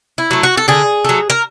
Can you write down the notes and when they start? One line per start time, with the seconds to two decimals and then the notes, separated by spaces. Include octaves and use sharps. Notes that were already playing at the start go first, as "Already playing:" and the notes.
0.18 E4
0.31 F#3 A3
0.43 F#4
0.57 A4
0.68 D3 G#4
1.05 F#3 A3
1.30 A#4